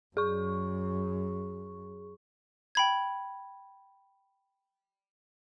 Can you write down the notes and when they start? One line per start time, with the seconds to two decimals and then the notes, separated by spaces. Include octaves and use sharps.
0.17 F#2 G#4 C#6
2.75 G5 B5 G#6